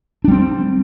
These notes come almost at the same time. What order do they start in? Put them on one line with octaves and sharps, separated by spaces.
D4 G3 C4